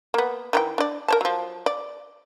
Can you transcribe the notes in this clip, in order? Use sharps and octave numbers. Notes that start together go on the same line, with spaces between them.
A#3 B3
D#3 E3 G5
D4 D5
A#4 C#5 A5
F3 F#3
D5